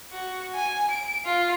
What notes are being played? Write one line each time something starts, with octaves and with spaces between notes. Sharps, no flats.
F#4
G#5
D7
F4